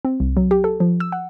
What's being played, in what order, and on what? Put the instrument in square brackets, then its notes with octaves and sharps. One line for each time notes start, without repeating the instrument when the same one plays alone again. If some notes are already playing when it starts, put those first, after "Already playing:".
[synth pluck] C4
C2
F#3
G4
A4
F3
E6
F#5